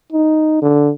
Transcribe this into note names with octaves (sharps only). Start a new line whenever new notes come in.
D#4
D3